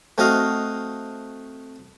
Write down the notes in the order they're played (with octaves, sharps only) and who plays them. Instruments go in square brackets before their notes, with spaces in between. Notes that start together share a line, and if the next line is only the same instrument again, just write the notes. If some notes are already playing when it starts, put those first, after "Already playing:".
[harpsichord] A3 C4 F#4 D#5 F5